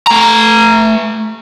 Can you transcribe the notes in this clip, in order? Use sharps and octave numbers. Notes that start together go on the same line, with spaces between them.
A3 A#5